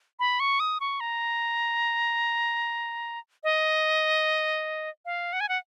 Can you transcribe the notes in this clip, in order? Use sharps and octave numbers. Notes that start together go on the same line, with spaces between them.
B5
C#6
D#6
C#6
A#5
D#5
F5
F#5
G#5
F#5